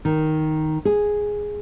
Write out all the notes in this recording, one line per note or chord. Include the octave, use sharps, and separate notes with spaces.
D#3
G#4